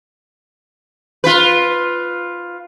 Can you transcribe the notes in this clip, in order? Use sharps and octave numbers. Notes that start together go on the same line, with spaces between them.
F4 B4